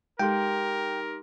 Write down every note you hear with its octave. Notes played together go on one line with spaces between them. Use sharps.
G#3 D#4 G4 A4 A#4 G5 C6